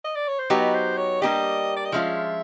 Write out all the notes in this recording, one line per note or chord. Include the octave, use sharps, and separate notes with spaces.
D#5
D5
C#5
C5
F#3 B3 D#4 G4 B4
C5
C#5
G3 A#3 D4 G4 D#5
D5
D#5
F3 G#3 C#4 F4 E5